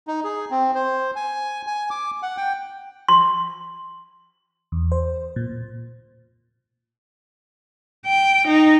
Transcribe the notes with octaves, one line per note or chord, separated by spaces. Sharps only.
D#4
G#4
C4
C5
G#5
G#5
D6
F#5
G5
C6
E2
C5
A#2
G5
D#4